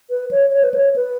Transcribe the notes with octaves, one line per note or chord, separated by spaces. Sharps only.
B4
C#5
C#5
B4
C#5
B4